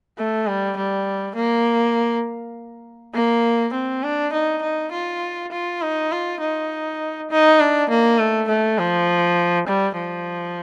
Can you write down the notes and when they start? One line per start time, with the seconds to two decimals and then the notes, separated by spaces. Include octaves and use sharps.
0.18 A3
0.47 G3
0.77 G3
1.36 A#3
3.15 A#3
3.74 C4
4.03 D4
4.33 D#4
4.63 D#4
4.92 F4
5.52 F4
5.82 D#4
6.12 F4
6.41 D#4
7.31 D#4
7.60 D4
7.90 A#3
8.19 A3
8.49 A3
8.79 F3
9.68 G3
9.98 F3